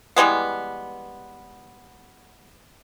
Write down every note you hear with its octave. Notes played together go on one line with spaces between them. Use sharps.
E3 G3 G#3 B3